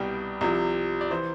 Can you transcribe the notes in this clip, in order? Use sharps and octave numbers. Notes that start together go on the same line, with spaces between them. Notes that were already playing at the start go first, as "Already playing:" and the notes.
Already playing: C2 B2 G3 G5
C2 C3 F3
D5
E3 C5